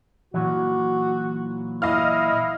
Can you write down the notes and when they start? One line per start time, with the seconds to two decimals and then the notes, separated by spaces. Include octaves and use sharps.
0.34 A#2 E3 F#3 F#4
1.82 E4 D#5 F5 F6